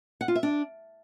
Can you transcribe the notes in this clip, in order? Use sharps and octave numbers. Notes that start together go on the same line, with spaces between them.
F#5
F4
E5
D4